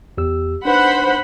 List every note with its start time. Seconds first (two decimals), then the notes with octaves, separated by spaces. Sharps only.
0.18 E2 G4 E6
0.65 D4 D#4 B4 C5 F#5 B5